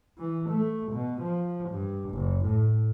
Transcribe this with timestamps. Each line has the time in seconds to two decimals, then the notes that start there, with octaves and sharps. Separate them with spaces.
0.18 E3
0.50 A3
0.93 B2
1.22 F3
1.70 G2
2.11 F#1
2.46 A2